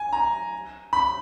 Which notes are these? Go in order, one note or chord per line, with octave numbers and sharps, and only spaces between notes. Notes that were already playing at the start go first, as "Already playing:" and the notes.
Already playing: G#5
A#5
B5